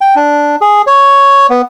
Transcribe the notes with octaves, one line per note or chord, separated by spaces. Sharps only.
G5
D4
G#4
C#5
B3